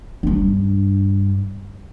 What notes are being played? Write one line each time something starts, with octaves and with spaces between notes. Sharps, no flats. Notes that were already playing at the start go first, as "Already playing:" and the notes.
G2 D4